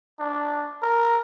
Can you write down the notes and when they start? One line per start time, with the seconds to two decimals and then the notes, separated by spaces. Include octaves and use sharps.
0.19 D4
0.83 A#4